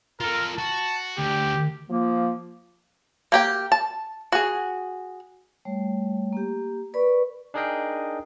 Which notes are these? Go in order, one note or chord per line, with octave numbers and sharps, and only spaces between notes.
F4 A4 A#4
F#4 A5
D2 G4
F3 A#3
A#3 G4 G5
A5
F#4 G#4
G3 A3 C#5
A#3 G4
A#4 B4 D5 B5 C#6
D4 D#4 G#4 A#4 D#5 G5